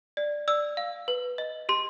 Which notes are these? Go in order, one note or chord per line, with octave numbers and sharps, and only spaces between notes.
D5
D5 E6
F5
B4
D#5
G4 C6